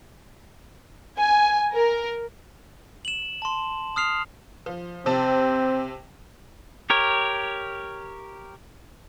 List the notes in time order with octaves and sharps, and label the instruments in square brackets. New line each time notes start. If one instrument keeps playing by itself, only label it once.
[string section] G#5
A#4
[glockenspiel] E7 F#7
A5 C6
D#6 F6 C7 F7
[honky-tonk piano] F3
[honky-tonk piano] C3 A5 [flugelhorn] C4
[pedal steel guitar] G4 A#4 C#5